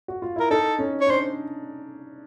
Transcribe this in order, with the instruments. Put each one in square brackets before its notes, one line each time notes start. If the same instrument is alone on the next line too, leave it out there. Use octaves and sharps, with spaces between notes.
[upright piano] F#4
F4
[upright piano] E4 [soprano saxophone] A#4
[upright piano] D#4 [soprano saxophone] A4
[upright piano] C#4
[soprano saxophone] C#5
[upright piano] D4 [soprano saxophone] C5